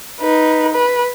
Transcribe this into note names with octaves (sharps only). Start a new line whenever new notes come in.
D#4 B4
B4